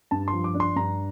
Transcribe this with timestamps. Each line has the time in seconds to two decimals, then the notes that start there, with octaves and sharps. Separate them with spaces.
0.11 G2 A5
0.28 C6
0.33 F3
0.44 D6
0.54 D4
0.60 C6
0.76 G2 A#5